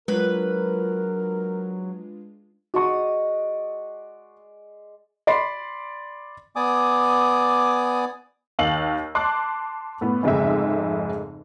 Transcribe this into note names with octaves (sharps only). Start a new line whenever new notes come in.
F#3 G#3 D4 F4 A#4 B4
G#3 F#4 D5 C#6 D#6
D5 B5 C6 C7
B3 D5 G#5 D6 D#6
D#2 F5 E6 F#7
A5 C6 D6 F#6
A2 B3
F1 F2 G#2 C#3 G#3 E5